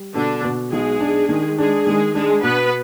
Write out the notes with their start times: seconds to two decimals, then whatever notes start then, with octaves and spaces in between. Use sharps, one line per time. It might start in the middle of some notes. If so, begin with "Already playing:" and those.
Already playing: G3
0.15 B2 D3 D4
0.44 B2
0.72 B1 G#3 G#4
1.00 D4
1.29 D#3
1.58 G#3 D4 G#4
1.86 D#3 G#3 G#4
2.14 G#3 D4 G#4
2.43 B2 B3 B4